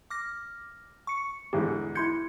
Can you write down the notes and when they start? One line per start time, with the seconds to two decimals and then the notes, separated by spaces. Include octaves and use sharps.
0.10 D6 F6 A#6
1.07 C#6 C#7
1.53 E2 G#2 D3 G4
1.95 E4 C6 G6 G#6 C#7